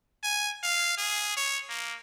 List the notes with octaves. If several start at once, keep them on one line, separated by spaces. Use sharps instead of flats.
G#5
F5
G#4
C#5
A#3